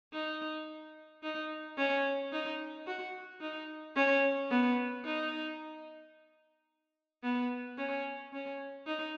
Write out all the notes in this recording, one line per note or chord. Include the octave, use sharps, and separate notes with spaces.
D#4
D#4
C#4
D#4
F#4
D#4
C#4
B3
D#4
B3
C#4
C#4
D#4